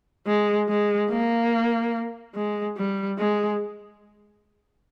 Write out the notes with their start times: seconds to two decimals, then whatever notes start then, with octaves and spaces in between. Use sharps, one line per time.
0.27 G#3
0.69 G#3
1.10 A#3
2.35 G#3
2.77 G3
3.18 G#3